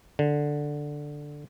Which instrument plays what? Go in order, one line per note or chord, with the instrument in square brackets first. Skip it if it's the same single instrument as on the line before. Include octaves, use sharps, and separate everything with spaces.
[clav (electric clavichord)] D3